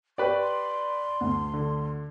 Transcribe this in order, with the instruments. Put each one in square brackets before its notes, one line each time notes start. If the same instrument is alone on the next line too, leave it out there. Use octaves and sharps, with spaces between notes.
[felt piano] G4 B4 [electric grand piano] D5 B5 [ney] C#6
[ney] C6
[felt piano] D2
[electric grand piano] D3